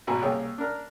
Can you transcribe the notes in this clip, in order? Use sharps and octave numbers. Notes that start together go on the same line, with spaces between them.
G#1 B2 F#4 B4 G#5 A#5
C2 A#3 G#4 C#5 G5
D4 A#4